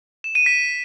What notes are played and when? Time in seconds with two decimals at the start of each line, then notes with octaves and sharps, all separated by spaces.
0.24 E7
0.35 D#7
0.46 B6